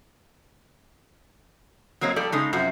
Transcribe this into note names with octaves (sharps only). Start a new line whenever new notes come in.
F#3 A#3 C4 C#5 D#5
F3 G3 A4 D5
C#3 G#3 C#4 D#4 A4
F#2 C3 F3 F#4